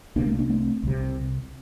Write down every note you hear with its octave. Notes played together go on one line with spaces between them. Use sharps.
C2 C3 A#3 D4
A3 C4
A#3 D4
A3 C4
C2 C3